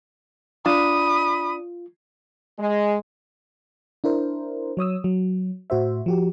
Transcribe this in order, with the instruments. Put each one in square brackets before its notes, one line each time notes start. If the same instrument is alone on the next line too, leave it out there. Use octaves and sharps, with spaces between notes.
[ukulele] D4 [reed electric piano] F4 [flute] B5 [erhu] D#6
[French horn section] G#3
[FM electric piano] D4 E4 A#4 C5
F#3 C#5 D#6 E6
F#3
A2 F#4 C5 E5
F3 F#4 G4